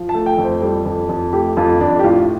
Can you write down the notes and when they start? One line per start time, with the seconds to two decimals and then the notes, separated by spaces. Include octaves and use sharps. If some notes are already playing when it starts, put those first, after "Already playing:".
Already playing: F3
0.09 A5
0.14 A3
0.26 G5
0.38 F2
0.44 C5
0.62 G3 A4
0.86 F2
1.09 F2
1.33 A3 G4
1.57 F2 F4
1.80 F2 D4
1.99 G4
2.04 A2 F4